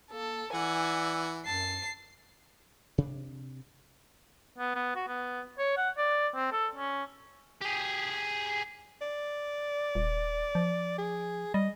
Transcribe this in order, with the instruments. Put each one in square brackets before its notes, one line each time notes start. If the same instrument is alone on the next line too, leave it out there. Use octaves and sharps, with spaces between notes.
[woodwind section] A#3 [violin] A4
[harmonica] E3 [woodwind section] D5 D6 E6 [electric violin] F#5 [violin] G#5
[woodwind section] F#2 [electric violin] A5 [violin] C7
[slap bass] C3 D4
[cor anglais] B3
B3
F#4
B3
C#5
F#5
D5
C4
A4
C#4
[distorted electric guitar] G4 G#4
[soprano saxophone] D5
[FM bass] D#1
F3
[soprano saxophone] G#4
[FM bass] G3 [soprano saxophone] D#5